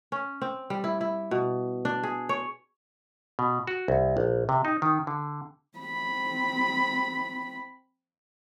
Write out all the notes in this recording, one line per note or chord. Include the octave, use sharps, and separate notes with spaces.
C#4
C4
G3
E4
E4
B2
D4
G#4
C#5
B2
F#4
C2
A#1
C3
D#4
D#3
D3
C4 B5